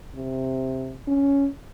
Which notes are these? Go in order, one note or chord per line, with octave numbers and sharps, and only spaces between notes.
C3
C#4